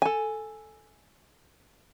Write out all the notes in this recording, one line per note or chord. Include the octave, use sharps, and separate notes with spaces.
A4 G#5